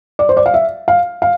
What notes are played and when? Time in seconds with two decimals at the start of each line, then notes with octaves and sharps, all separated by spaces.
0.19 D5
0.29 C5
0.37 D5
0.46 F5
0.54 E5
0.88 F5
1.22 F5